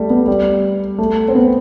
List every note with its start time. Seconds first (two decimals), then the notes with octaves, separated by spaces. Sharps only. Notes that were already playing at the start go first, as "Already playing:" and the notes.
Already playing: G3 A3
0.10 B3
0.27 G3
0.98 A3
1.28 C4
1.35 B3